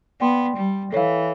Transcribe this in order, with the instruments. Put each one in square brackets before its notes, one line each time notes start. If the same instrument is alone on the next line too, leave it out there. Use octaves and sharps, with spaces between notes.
[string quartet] B3 [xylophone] D5 G5 C6
[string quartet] G3
[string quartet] E3 [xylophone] A4 C#5 F5